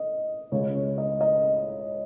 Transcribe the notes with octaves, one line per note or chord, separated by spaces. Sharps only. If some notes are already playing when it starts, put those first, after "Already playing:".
Already playing: D#5
C#2 C#3 C#5
C#5
D#5
D#5